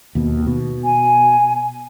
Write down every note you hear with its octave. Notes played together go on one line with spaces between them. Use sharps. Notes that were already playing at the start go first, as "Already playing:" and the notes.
D#2 B2
B2
G#5